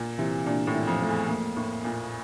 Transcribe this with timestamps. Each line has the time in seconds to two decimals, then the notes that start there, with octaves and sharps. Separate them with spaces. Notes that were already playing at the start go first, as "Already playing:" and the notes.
Already playing: A#2
0.18 C3 E3
0.46 A#2 D4
0.67 A2
0.74 E3
0.87 F2
1.01 A3
1.09 E2
1.28 F2 A#3
1.56 A2 A#3
1.84 A#2 A#3